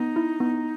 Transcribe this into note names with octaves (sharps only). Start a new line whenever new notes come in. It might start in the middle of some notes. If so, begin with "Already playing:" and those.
Already playing: B3 D#4
E4
B3